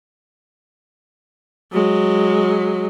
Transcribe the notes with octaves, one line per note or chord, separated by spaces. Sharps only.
F#3 G#3